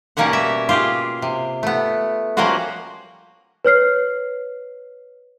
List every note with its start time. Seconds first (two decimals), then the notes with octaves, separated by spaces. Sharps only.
0.17 B2 G3 A#3 C#4 C#5 F#5
0.33 E5
0.69 F4 G4 G#4
1.22 C3
1.63 A3 B3
2.37 F3 G3 A#3 C#4 F4 F#4
3.65 B4 C#5 F6 C7